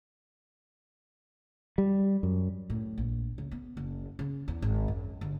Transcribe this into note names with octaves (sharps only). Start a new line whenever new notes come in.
G3
F#2
A2
A#1
C#2
B3
F#1
C#3
E2
G#1
F#2
G1